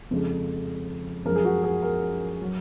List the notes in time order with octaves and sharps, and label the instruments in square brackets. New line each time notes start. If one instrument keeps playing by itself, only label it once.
[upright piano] F2 C#3 F3 G#3
F#2 F3 G#3 A#4
G#4
F#4
G#4
A#4
F#3